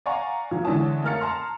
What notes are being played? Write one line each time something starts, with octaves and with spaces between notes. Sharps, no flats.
D5 F5 F#5 G#5 A#5 C#6
A#2 F3
D3 E3 G#3 C#4 A5 D#6
A3 A#4 F5 F6 A6 C#7
A5 A#5 C6 F6